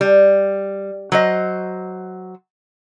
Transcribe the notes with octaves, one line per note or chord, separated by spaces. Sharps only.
G3
F#3 C5 D#5